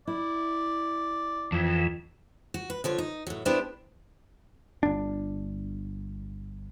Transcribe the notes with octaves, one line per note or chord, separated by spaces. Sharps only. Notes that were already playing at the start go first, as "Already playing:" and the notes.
E4 D5
F2 E3
F#4
B4
D3 F3 C#5
D#4
A2 F#3
B3 D4 E4 G4 C5
G1 D4